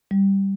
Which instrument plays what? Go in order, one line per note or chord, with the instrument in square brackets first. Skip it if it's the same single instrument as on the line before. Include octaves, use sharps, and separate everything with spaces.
[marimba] G3